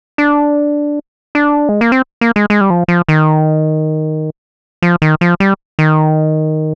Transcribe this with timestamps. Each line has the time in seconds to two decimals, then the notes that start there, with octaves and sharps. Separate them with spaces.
0.18 D4
1.35 D4
1.69 G#3
1.81 A#3
1.92 C4
2.21 A#3
2.36 G#3
2.50 G#3
2.61 G3
2.70 F3
2.88 F3
3.08 D#3
4.82 F3
5.02 D#3
5.21 F3
5.40 G3
5.79 D#3